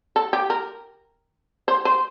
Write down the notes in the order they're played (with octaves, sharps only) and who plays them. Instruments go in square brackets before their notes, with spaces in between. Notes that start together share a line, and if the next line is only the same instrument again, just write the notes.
[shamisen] A4
G4
A#4
C5
C5